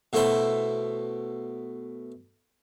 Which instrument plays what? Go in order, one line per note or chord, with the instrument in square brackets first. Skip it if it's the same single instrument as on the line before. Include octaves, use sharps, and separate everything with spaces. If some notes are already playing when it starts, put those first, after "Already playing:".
[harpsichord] B2 A3 E4 C5